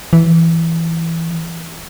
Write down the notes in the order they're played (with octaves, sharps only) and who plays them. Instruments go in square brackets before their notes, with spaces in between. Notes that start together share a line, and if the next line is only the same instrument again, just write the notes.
[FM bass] E3